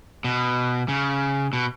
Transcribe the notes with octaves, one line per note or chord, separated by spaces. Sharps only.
B2
C#3
B2